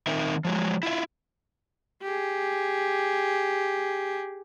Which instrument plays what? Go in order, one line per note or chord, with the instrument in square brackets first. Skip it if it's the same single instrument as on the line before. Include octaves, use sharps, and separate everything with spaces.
[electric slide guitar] D#3 C4 D#4 A#4 E5
F3 F#3 G#3
E4 F4 E5
[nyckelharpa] G4 G#4